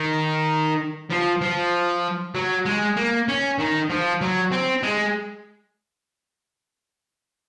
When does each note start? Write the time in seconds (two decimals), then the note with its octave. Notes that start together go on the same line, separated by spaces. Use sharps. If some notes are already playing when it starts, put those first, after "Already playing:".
Already playing: D#3
1.10 F3
1.41 F3
2.35 F#3
2.65 G#3
2.96 A#3
3.28 C#4
3.59 D#3
3.90 F3
4.21 F#3
4.52 C4
4.83 G#3